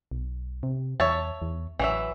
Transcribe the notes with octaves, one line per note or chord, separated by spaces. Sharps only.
B1
C3
E2 C#5 E5 A5
E2
A1 E3 F#3 E5